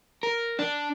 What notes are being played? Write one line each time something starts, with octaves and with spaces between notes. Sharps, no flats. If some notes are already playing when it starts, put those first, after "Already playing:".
A#4
D4